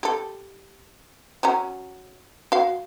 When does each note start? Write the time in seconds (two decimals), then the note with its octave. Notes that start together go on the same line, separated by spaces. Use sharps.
0.03 G4 A4
1.43 F#3 C#4 A#5
2.52 F#4 F5